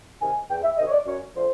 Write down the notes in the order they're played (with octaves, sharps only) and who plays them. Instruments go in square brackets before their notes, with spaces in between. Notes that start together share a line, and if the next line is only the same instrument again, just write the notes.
[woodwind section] C3 D#3 G#5
E2 G5
E5
C3 D#3 D#5
C#5
D5
F#2 C#5
D3 F3 A3 C5